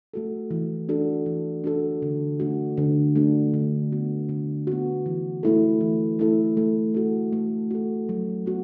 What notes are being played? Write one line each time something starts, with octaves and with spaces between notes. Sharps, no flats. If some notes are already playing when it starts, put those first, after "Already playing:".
A3 F#4 A4
E3
D4 F#4 A4
E3
D4 F#4 A4
D3
A3 D4 F#4
D3
A3 D4 F#4
D3
B3 F#4
D3
B3 F#4
E3
A3 E4 A4
E3
A3 E4 A4
A3
F#4 A4
A3
F#4 A4
F#3
B3 F#4